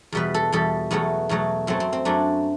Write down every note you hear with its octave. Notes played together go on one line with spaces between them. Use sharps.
E2 B2 G3 B4
A4
E2 B2 G3 A4
E2 B2 F#3 A3 B3
E2 B2 F#3 A3
F#2 F#3 A3 C4
C4
C4
F#2 F#3 A3 D4